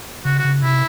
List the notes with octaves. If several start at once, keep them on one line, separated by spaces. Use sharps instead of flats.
C#3 F#4
F#4
C#3
C3 E4